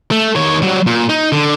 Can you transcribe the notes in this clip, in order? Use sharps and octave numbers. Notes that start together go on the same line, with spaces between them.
A3
D#3 C#5
F#3 G3
A#2
D#4
D3